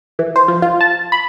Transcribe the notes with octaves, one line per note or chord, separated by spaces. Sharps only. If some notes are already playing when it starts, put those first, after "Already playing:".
E3
C5
F3
F4
A5
B5